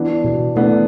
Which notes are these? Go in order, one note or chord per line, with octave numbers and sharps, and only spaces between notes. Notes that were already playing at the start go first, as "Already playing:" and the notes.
Already playing: E3 B3 D4
B2
E3 A3 B3 D4